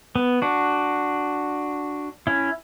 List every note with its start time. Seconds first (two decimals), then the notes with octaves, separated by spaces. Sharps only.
0.15 B3
0.42 D4 F#4
2.27 C#4 E4